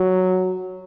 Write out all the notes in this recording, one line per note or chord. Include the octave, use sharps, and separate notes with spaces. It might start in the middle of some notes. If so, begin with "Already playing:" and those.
Already playing: F#3